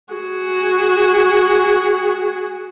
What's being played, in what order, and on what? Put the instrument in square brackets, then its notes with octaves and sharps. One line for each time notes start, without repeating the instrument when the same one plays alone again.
[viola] F#4 G#4